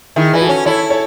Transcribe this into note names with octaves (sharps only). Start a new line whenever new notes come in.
D#3 E4 G#4
E3 B4
F#4 A4
C#4
E4 A4 C#5
A4 C#5